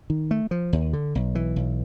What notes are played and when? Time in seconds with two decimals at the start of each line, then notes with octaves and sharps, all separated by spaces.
0.10 D#3
0.31 A3
0.51 F3
0.73 D#2
0.93 D3
1.15 B1
1.35 E3
1.56 B1